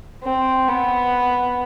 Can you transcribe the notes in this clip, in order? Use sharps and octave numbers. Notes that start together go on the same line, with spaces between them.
C4
B3